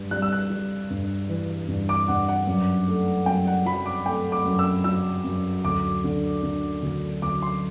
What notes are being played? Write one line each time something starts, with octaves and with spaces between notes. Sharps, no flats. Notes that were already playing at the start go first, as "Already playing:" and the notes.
Already playing: G2 G3
G3 F#6
E6
F#6
G3
G2
E3
G2
D6
G2 F#5
F#5
F#2
A3
F#2 G5
F#5
F#3 B5
D6
A3 G5
D6
F#2
E6
F#3 E6
F#2
D2 D6
D3
D3
D2
D2 D6
C6